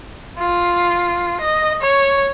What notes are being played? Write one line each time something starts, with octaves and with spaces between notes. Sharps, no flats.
F4
D#5
C#5